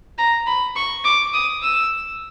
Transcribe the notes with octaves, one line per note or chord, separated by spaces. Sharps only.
A#5
B5
C#6
D6
D#6
E6